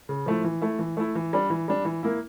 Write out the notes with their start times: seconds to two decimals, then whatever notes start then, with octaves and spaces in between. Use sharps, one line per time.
0.09 C#3
0.26 F3 A3 E4
0.44 E3
0.62 A3 E4
0.79 E3
0.97 A3 E4
1.15 E3
1.33 G3 D4
1.50 E3
1.68 G3 D4
1.85 E3
2.03 A#3 E4